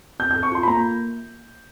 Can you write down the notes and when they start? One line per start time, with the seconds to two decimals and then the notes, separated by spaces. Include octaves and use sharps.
0.19 C4 G6
0.31 G6
0.36 A4
0.43 C#6
0.52 F4 C6
0.63 B5
0.68 A#3 A#5